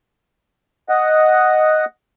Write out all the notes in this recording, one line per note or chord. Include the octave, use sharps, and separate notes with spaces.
D#5 F#5